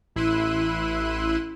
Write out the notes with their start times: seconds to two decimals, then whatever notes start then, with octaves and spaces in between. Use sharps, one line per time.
0.16 A1 E4 C6 E6 F#6 D#7